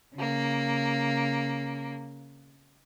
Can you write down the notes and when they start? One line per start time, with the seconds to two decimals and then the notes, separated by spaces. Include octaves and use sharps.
0.16 C#3 A#3